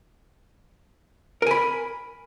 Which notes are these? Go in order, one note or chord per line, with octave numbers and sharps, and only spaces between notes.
A#4 G#5 B5